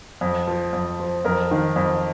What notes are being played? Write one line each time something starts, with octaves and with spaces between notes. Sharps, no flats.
F2
F3
F2
F3
F2 A#4
D#3
F2